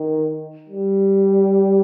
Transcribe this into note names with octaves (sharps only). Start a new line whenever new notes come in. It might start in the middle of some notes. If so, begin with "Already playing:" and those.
Already playing: D#3
G3